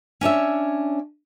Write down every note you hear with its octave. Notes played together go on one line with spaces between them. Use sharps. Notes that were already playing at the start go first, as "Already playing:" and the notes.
C#4 D4 C#5 E5